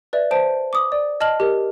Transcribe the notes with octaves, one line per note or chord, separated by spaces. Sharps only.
B4 D5 E5
C5 A5 D7
D6 D#6
D5
D#5 A5 F6 A#6 F#7
G4 A#4